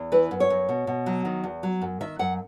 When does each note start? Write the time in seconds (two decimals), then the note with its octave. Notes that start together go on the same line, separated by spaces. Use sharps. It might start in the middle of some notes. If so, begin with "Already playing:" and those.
Already playing: E2
0.12 E3 B4
0.31 F#2
0.40 C#5
0.50 F#2
0.69 B2
0.87 B2
1.06 F#3
1.25 D#3
1.44 E2
1.63 F#3
1.82 F#2
2.01 D#3 E5
2.19 F#2 F#5